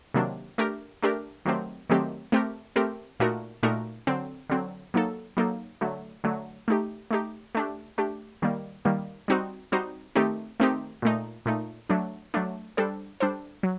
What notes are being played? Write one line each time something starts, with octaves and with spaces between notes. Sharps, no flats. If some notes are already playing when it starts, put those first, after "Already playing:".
C3 D#3 F#3 A#3 D4
A3 D4 G4 A#4
A3 D4 G4 A#4
D#3 F#3 A3 C4 G4
D#3 F#3 A3 C4 G4
A3 C4 G4 A#4
A3 C4 G4 A#4
A#2 A3 D#4 F#4 A#4
A#2 A3 D#4 F#4 A#4
D3 F#3 C4
D3 F#3 C4
F#3 A#3 D#4 A4
F#3 A#3 D#4 A4
D3 F#3 A3
D3 F#3 A3
A3 D#4 G4
A3 D#4 G4
A3 D4 G4
A3 D4 G4
D#3 G3 A#3
D#3 G3 A#3
G3 C4 D#4 F#4 C5
G3 C4 D#4 F#4 C5
D#3 A3 C4 D#4 G4
D#3 A3 C4 D#4 G4
A#2 A3 D#4
A#2 A3 D#4
F#3 A3 D4
F#3 A3 D4
G3 D4 A4 C5
G3 D4 A4 C5
F#3